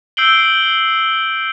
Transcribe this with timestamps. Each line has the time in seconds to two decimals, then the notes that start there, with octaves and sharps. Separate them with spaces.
0.17 E6 G6 C7 D7 F#7 G7